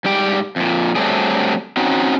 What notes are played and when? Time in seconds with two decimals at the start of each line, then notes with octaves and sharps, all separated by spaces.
0.05 G#2 G3 G4 G5
0.56 F2 A#2
0.96 F#3 G3 A3 C4 D4 G#4
1.77 C4 C#4 D#4 F#4